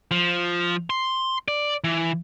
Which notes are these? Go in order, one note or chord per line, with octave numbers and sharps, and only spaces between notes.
F3
C6
D5
E3